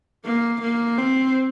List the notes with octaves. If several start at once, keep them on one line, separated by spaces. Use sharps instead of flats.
A#3
A#3
C4